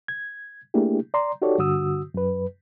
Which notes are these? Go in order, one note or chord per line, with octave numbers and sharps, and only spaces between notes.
G#6
A3 A#3 D4 E4 G4 G#4
D5 A#5 C6
D#4 F#4 G4 A4 C#5 D5
G2 D3 F#4 D#6 E6
F#2 B4